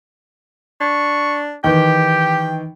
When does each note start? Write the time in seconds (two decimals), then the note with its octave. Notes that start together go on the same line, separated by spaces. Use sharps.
0.81 D4 C#6
1.64 D#3 E3 G4 G5